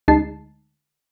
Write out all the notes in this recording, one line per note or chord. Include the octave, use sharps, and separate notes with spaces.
D2 G#3 D#4 A5 C7